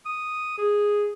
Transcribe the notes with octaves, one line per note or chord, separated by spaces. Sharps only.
D#6
G#4